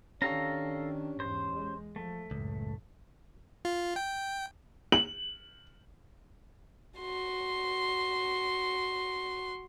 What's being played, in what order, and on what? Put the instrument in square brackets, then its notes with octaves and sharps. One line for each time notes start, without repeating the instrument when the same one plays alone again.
[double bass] D#3 D4 [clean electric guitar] C#4 G4 C#5 [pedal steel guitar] A4 F5 A#5
[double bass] E2 G#2 [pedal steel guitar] C5
[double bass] G#3
[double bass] F3 [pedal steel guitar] A3
[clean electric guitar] C#2 [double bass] F#2 A2
[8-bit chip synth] F4
G5
[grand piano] F#7
[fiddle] F#4 C6